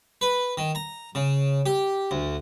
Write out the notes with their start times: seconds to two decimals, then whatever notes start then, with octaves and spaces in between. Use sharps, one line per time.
0.21 B4
0.57 D#3
0.75 A#5
1.15 C#3
1.66 G4
2.11 D2